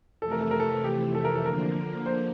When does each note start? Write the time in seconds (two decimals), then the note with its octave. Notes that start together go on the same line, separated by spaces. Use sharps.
0.22 F2 C3 E3 A3 A4
0.31 A#4
0.41 A4
0.51 A#4
0.60 A4
0.84 G4
1.15 A4
1.25 A#4
1.35 A4
1.45 D3 F3 A#3 A#4
2.06 C5